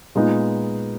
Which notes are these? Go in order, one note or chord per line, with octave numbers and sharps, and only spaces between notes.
A#2 G#3 B3 D#4